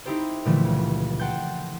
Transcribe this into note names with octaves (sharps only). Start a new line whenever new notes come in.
C4 D#4 E4 G4 A4 C5
A#2 D3 E3 F3 A3
C#2
F#5 G5 A5 C6 G6